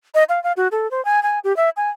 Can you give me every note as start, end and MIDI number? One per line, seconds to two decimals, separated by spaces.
0.15 0.24 75
0.29 0.42 77
0.44 0.52 77
0.57 0.68 66
0.72 0.90 69
0.91 1.03 72
1.05 1.22 80
1.23 1.39 80
1.44 1.55 67
1.57 1.70 76
1.77 1.90 80